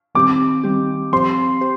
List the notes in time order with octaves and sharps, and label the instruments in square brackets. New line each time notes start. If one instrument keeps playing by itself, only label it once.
[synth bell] D#3 G3 C4 G4 [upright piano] D6
[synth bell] D#3 G3 C4 G4
[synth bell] F3 C4 G4 C5 [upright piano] C6
[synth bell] G4 C5